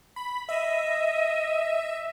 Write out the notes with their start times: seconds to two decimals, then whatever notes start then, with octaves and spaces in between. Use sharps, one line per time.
0.16 B5
0.49 D#5 E5